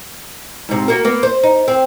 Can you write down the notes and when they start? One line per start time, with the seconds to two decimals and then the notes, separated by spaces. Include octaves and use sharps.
0.69 G#2 C3
0.88 A#3 F#4 A#4
1.05 A#3 B3
1.23 C5
1.43 D#4
1.68 C4